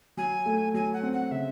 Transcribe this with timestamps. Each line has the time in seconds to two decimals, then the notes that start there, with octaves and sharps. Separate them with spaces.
0.17 F#3 G#5
0.46 A3
0.74 F#3 G#5
0.93 F#5
1.03 C4
1.12 F#5
1.31 C#3 E5